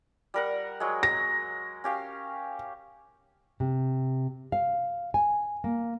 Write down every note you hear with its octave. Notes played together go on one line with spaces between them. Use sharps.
G3 A#4 F#5
F#3 G#3
A#6
C#4 G4 F5
C3
F5
G#5
A#3